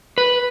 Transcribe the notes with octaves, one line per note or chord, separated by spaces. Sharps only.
B4